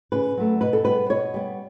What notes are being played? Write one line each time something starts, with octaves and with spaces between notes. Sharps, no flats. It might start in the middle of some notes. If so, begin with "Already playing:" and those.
C#3 B4
F#3 A3
B2 B4
A4
G3 B3 B4
B2 C#5
G3 B3